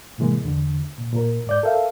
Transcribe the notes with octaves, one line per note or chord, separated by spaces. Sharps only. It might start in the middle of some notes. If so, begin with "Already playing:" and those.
A2 C3 E3 G#3 A#3
E2 D3
A#2
A#2 A#4
G#2 D5 G6
A4 A#4 E5 F5